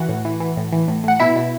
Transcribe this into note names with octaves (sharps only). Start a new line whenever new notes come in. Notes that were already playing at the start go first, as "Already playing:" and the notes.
Already playing: E3 F#4 F#5
A2
E3
E3
A2
E3
A2
A2 F#5
B2 E4 E5
B2